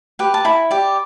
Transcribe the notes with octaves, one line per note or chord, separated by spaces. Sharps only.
G4 B4
A5
E4 B5
G4 D5